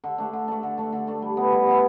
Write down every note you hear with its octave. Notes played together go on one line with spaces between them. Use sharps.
D3
A3 D4
D3
A3 D4
D3
A3 D4
D3
A3 D4
G3
B3 E4
G3
B3 E4